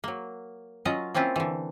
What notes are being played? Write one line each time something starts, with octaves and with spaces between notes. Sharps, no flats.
F#3 A#3
F#3 C#4 F4 D#5 A#5
A#3 C4 C#4 E4 F4
D3 E3